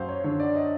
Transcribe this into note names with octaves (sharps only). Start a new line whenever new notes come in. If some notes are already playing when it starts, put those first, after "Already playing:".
Already playing: F#2 F#3 C5 F5
C#5
D3 C#5
D5
D#5